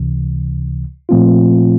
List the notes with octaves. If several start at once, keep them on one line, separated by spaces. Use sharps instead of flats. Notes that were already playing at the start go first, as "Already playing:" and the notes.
Already playing: C#2 C3 E3
A#2 F3 A3 C4 F4